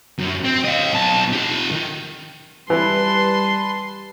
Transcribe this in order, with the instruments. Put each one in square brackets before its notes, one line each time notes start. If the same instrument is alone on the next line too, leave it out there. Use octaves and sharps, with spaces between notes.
[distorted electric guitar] F#2
C4
D#5 F5
B1 A5
F4 G4
D#3
[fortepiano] E3 [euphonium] G3 [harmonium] B4 A5 [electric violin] C6